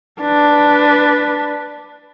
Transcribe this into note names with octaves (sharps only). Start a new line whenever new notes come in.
D4 B4